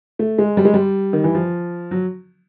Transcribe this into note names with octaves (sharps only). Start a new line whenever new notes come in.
A3
G#3
G3
G#3
G3
D#3
E3
F3
F#3